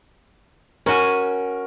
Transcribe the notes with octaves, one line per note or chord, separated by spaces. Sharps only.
C#4 F#4 A#4 G#5